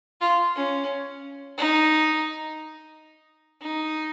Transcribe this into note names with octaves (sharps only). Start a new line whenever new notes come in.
F4
C#4
D#4
D#4